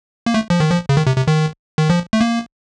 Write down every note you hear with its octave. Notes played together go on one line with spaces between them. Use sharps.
A#3
A3
F3
D#3
F3
C#3
D#3
C3
C3
D#3
D#3
F3
A3
A#3